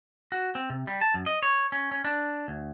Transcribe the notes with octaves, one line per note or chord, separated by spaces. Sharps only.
F#4
C4
C3
G3
A5
F#2
D#5
C#5
C#4
C#4
D4
D2